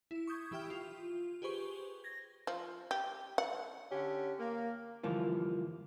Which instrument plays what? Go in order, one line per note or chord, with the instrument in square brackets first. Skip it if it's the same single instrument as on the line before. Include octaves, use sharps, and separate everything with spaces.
[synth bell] E4
C#6 D#6 G6 G#6
E3 E4 G4 E5 G5 F6
F4
G4 G#4 B4 C5 C#6 G7
G#6 A#6
[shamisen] F3
G4
F#5
[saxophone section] D3 C#4 G4
A#3
[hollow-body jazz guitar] G2 D3 E3 F3 A#3 F4